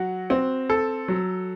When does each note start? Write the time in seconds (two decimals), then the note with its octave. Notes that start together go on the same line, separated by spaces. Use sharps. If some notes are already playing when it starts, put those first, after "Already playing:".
Already playing: F#3 F#4
0.30 C4
0.70 A4
1.08 F#3